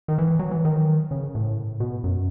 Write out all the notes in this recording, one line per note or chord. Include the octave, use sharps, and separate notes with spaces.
D#3
E3
F#3
E3
D#3
C#3
A2
B2
F#2